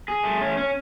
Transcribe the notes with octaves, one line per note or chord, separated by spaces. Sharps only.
G#4
A3
C#4
C#4